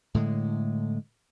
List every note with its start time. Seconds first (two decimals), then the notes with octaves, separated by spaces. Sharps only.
0.14 A2 D3 G#3